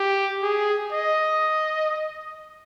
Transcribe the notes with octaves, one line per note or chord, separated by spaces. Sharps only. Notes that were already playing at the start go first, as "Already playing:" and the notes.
Already playing: G4
G#4
D#5